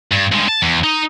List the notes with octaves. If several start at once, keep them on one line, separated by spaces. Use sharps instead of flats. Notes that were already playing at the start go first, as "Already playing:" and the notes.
G2
G2 G#3
A5
E2
D#4